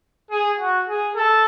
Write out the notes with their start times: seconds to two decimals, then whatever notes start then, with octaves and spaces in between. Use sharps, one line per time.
0.31 G#4
0.59 F#4
0.88 G#4
1.16 A4